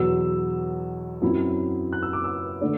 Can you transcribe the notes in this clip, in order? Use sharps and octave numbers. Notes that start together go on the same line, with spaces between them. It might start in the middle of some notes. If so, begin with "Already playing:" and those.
Already playing: E2 B2 F#3 E6
F#2 F#3 C4 E4
F#6
E6
D6
E6
D3 A3 D4